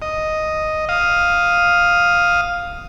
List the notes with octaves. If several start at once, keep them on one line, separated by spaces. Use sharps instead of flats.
D#5
F5 D#6